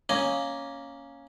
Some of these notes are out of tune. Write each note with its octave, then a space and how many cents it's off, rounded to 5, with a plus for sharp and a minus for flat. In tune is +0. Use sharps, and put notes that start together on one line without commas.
A#3 +0 C#4 +0 D#5 +0